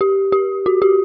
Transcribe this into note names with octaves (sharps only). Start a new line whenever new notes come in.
G4
G4
F#4
G4